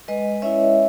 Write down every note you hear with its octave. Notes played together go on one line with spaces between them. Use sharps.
G#3 B4 D#5
C#4 E4 C#5 E5